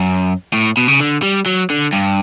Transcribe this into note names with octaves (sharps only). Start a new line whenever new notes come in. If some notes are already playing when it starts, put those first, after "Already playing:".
Already playing: F#2
A2
B2
C#3
D3
G3
F#3
D3
G2